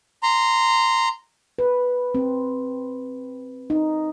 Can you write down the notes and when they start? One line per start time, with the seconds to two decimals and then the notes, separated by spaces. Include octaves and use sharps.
0.23 A#5 C6
1.59 B4
2.15 C4
3.70 D#4